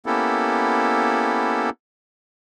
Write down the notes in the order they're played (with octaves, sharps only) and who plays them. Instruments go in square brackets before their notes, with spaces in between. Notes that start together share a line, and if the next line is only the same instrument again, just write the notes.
[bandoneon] A#3 B3 C#4 E4 G4 A4